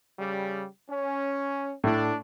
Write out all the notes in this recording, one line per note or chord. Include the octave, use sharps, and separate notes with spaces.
C#3 G3
C#4
A2 D4